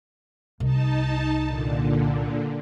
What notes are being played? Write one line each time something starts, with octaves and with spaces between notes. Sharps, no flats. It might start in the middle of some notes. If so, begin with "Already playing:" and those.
C2 D#4 A5
A#2 D3